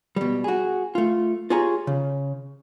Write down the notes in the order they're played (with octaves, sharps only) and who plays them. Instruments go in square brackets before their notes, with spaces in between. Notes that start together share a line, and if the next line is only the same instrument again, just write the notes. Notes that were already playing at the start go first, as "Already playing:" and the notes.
[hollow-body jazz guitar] B2 G3
F#4 G#4
A3 F4
F4 G4 G#4 C#5 G#5 A#5
C#3